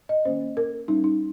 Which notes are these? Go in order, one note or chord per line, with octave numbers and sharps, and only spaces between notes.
D#5
D#3 A#3 C#4 C5
A#4
G3 C#4 D#4
D#4